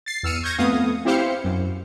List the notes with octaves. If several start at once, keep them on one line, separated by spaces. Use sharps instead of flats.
A6 C7
E2 E6 F6 C#7 D#7
C#6 G6 G#6 A#6 C#7
F2 A3 B3 F5 D#6
C4 E4 G4 C5 F5 C#7
F#2